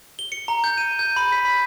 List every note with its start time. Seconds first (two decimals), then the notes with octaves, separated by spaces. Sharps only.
0.19 G7
0.32 C#7
0.48 A#5
0.64 G6
0.78 D#7
0.99 G6
1.16 B5
1.32 B6
1.45 B5